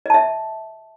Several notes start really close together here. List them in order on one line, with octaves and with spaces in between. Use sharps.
D#5 A5 E5